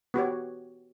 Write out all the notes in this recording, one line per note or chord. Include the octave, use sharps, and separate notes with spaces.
B3 F#4 G4 C#5